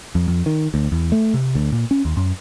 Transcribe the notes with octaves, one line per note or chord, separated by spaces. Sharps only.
F2
F2
D#3
D2
E2
A3
C3
D2
A#2
C#4
D#2
F#2